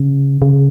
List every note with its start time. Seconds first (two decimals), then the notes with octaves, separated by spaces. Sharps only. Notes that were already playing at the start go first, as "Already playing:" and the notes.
Already playing: C#3
0.42 C#3